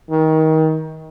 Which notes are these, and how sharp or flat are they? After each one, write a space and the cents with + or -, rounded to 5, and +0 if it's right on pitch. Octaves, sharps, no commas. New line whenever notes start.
D#3 +25